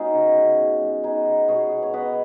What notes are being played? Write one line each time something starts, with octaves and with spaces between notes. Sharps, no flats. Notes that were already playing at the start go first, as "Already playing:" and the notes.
Already playing: G#3 B3 C#4 D#4 F#4 G#4
C#3
C#3
B2
G#3
B3 D#4 G#4
B2
B2 G#4 C#5
B2
C#5
B3 B4 D#5